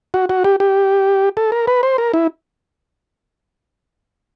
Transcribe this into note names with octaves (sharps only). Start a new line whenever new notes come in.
F#4
F#4
G4
G4
A4
A#4
B4
C5
A#4
E4